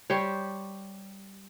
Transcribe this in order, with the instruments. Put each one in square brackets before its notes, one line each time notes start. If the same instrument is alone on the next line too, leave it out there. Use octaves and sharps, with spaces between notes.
[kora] G3 G4 C5 C#5